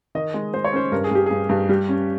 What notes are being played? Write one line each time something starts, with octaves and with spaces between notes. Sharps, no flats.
D#3 D#5
G#3
G#3 C5
C#5
C#4 C5
G2 A#4
G#4
G2 G4
G2 G#4
G2
G3 G4
C#4